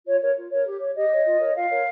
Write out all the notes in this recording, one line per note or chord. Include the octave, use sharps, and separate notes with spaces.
F4 C#5
A#4 C#5
F4
A#4 C#5
G4
C#5
G4 D#5
C#5
F4
A#4 C#5
F4 F5
A#4 C#5